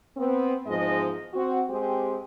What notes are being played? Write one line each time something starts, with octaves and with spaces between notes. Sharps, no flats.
B3 C4
E2 G#2 F3 G#3 D#5
C4 F#4
G#3 C4 G4